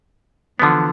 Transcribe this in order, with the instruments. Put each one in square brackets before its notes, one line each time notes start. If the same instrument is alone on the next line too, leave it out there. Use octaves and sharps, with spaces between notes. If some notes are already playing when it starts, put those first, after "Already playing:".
[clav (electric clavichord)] D3 F3 B3 [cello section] E3